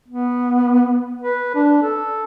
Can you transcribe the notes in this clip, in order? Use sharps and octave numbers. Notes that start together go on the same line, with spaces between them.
B3
B4
D4
A4